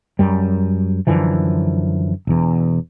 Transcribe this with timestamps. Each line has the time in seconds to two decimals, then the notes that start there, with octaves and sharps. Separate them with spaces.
0.19 F#2 G3
1.07 F#2 D3 E3 F3
2.27 E1 E2